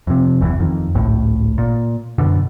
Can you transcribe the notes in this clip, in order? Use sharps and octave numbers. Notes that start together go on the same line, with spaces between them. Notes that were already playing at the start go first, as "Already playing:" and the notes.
F2 C3
F#1 E2 G#2 E3
F2 D#3
G#1 C#2 A2
A#2
F#2 B2 D3